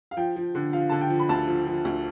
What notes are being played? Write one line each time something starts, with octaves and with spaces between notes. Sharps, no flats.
F5
F3 G5
F3
D3
F3 F5
D3 A5
G5
F3
B5
D2 A5
F3
F3
D2